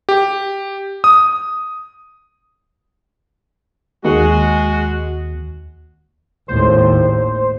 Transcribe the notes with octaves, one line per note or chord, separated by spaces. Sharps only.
G4
D#6
D#2 G#3 F#4
G#1 D#2 A2 C5